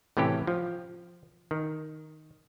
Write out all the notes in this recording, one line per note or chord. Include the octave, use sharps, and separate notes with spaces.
A2 C3 E3 C#4 G4
F3
D#3